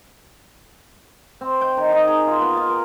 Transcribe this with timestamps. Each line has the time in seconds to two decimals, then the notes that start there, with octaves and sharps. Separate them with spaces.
1.41 C4
1.61 G5
1.77 D#3
1.92 D#4
2.08 G#4
2.27 F4
2.41 B3
2.57 F4
2.70 A#4